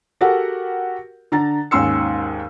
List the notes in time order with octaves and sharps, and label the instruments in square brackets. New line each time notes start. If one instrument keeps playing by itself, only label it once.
[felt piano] F#4 G4 A4 A#4 F#5
D3 A#5 A6
D#2 G#2 C#4 C6 E6 C#7